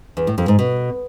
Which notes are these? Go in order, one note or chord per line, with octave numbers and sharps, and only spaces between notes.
E2
A2
F2
G#2
B2